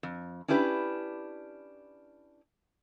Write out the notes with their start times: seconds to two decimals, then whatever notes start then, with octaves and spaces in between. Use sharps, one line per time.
0.03 F2
0.48 C#4 D4 E4 G4 B4